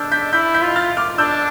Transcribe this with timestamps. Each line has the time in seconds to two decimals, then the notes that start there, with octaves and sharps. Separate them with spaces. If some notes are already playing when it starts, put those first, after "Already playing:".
Already playing: D4 E6 F6 G6 B6
0.12 G6 B6
0.33 E4 G6 B6
0.54 G6 B6
0.62 F4
0.76 F6 A6
0.97 D6 F6
1.18 D4 E6 G6